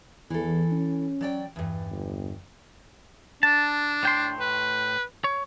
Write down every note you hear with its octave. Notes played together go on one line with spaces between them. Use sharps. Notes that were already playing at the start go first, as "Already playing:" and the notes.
E2 E3 A4
C#4
F#3 D5 G5
E2 G2
G1
D4 A5
A2 G5 C6
B4
C#5